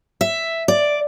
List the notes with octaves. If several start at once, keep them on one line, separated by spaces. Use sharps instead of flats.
E5
D5